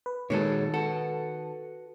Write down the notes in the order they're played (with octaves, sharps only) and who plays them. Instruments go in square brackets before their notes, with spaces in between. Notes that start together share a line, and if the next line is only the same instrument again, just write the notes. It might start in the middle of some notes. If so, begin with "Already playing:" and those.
[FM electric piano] B4
[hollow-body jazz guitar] A#2 G#3 A4 [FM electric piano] D#3 A5 [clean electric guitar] F#4 G#4 C#5
[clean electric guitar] F#4 B4 F#5 [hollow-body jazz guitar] A4